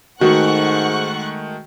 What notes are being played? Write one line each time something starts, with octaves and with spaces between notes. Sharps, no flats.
G#2 D#3 G#3 A3 F#4 F#5 C#6 F#6